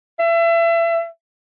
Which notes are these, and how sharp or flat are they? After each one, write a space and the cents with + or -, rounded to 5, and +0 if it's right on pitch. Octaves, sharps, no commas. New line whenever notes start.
E5 +30